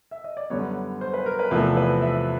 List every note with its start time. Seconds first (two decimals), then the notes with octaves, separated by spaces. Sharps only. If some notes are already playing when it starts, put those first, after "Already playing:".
0.11 E5
0.24 D#5
0.37 D5
0.50 F#2 D3 G3 B3 C#5
1.01 C5
1.14 B4
1.26 A#4
1.39 B4
1.51 E2 C3 F3 A3 B4
1.77 B4
2.02 E5